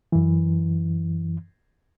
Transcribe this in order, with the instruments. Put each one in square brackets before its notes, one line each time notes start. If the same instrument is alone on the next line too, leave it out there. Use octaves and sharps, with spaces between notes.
[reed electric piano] F#2 E3